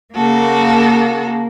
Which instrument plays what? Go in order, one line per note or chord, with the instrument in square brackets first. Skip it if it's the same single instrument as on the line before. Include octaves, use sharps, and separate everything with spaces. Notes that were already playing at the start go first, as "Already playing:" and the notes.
[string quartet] C#3 F#4 A4 [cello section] A#3